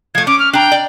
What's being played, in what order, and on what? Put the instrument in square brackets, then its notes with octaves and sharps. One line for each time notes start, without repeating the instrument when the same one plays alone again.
[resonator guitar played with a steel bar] F3 A3 [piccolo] G#6
[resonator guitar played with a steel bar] C#4 [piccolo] D6
[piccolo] F6
[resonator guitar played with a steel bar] D4 A#5 [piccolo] G5
[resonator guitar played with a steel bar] D5